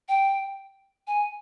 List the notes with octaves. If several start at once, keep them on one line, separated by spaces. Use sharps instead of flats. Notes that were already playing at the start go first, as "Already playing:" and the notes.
G5
G#5